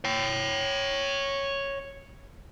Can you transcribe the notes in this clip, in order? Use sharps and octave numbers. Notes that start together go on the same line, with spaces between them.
C#5 G5